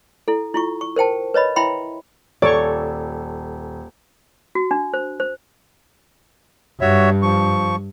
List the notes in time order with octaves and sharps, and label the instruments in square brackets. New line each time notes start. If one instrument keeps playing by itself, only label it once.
[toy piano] E4 A4
E4 F4 C#6
C#6
A#4 C5 G5 A5
B4 C#5 D#5 B5
E4 E5 G5 B5 C6
[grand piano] D#1 [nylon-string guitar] A4 [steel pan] C#5 C#6 [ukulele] D5
[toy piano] F#4
D4
C5
C5
[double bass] G2 [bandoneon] F#4 C#5 E5
[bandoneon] F3 C#6